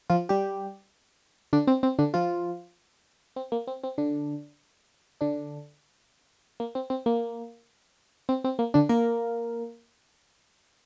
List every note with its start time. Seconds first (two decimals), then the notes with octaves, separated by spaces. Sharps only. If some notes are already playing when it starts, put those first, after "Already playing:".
0.10 F3 F4
0.29 G3 G4
1.53 D3 D4
1.67 C4
1.83 C4
1.99 D3 D4
2.14 F3 F4
3.36 C4
3.52 A#3
3.67 C4
3.84 C4
3.98 D3 D4
5.21 D3 D4
6.60 A#3
6.75 C4
6.90 C4
7.06 A#3
8.29 C4
8.44 C4
8.59 A#3
8.74 D3 D4
8.89 A#3 A#4